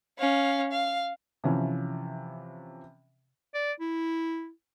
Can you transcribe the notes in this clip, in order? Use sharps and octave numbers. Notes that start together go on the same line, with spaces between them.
C#4 F5
F5
C3 E3 F3 C#4
D5
E4